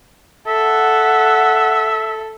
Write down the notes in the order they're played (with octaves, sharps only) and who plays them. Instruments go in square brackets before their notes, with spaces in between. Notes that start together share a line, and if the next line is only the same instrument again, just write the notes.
[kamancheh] A4 [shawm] E5 [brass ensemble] F#5